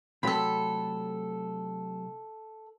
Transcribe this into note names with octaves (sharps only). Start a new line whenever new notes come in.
C3 F#3 A3 A4 B5